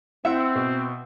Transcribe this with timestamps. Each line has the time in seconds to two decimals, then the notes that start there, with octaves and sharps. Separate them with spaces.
0.25 C4 E4 E5 F#5
0.55 B2